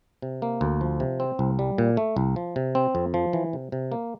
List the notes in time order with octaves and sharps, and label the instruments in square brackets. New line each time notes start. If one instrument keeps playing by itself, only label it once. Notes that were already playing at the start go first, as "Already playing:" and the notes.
[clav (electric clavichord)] C3
A#3
D2
F3
C3
C4
C2
G3
A#2
A3
C2
F3
C3
C4
F2
F3
E3
C3
C3
A#3